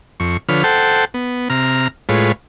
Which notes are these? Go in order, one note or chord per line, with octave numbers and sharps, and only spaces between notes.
F2 C#6
D3 F3 B4 C#5 F6
A4 C5 F#5 G5 A5
B3
C3 A#5 F6
A2 G#3 F4 B4 C#5